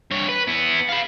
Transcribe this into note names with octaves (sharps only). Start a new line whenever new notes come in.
G2 C#5
B4
B3 E4
F5 B5